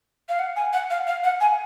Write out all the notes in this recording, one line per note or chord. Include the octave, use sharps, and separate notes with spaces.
F5
F#5
G#5
F#5
F5
F5
F#5
G#5